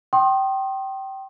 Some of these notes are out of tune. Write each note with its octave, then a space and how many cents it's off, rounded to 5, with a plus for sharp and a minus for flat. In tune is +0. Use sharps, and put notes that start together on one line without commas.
G5 -20 C6 +35 D#6 -15